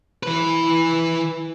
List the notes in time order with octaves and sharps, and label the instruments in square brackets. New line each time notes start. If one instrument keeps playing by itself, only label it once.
[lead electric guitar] E3 B4